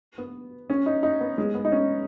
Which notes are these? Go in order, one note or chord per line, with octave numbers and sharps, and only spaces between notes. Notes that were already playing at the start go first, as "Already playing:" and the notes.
B3
C#4
D#4
D#4
B3
G#3
B3
D#4
C#4